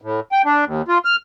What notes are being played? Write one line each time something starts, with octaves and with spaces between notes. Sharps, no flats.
A2
G5
D4
D#2
F4
F6